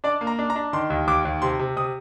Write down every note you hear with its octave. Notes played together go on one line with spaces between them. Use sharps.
D4 D5
A#3
A#5
D4
A#5
D4
D#3 C6
D#2
D#2 D6
D#2
C3 C6
C3
C3 D#6